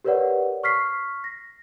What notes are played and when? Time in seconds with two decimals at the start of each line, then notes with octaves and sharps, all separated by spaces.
0.04 G4 A#4 B4 C#5 D5 F#5
0.64 C#6 F6 B6 C7
1.24 A#6